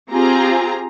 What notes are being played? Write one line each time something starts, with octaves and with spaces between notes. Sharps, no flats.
C4 F4 G4 G#4 A#5